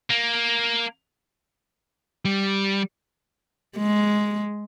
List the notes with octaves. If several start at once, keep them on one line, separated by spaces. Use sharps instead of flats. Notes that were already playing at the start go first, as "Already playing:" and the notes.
A#3
G3
G#3